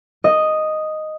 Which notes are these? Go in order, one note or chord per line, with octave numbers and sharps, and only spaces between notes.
D#5